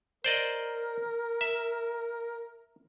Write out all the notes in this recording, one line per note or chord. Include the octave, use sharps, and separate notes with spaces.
A#4 C5 D5 D#5
E5